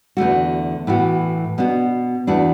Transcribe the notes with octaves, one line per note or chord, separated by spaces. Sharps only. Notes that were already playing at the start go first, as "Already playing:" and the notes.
E2 D3 A3 F#4
A2 E3 B3 F#4
B2 B3 D4 F#4
E2 E3 A3 D4 F#4